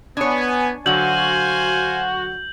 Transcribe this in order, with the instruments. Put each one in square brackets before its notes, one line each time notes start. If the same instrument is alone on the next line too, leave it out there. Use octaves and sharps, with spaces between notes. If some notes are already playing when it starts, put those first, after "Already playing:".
[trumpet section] B3 [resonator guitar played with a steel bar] D4 C#5 [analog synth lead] G#5
[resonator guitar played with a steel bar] D3 F#3 [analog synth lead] F#4 [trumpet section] C5 F5 G#5 [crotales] G6 F#7